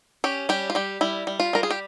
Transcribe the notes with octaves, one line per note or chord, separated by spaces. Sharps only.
C#4 G4
G3 G4
F4
G3 G4
G3 E4
G3
F4
G3 A#4
G#4
G4